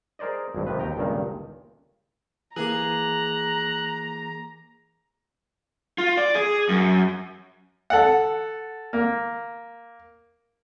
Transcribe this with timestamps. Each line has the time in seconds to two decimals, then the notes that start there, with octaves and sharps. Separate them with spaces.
0.19 G#4 A#4 C5 D5 D#5
0.55 G#1 G2
0.67 C3 D#3 F3 B4
0.79 D#2 G5 A#5
0.97 G1 C#2 G2 A#2 D#3
2.56 E3 A#3 G#4 A#5 D6 F#6
5.98 F4
6.17 D5
6.35 G#4
6.69 F#2
7.90 A4 F#5
8.93 A#3